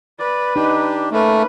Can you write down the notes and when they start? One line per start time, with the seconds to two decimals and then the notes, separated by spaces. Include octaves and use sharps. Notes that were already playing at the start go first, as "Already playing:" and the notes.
0.19 B4 D5
0.56 D4 D#4 G4
1.12 A3 A#3 C#4 B4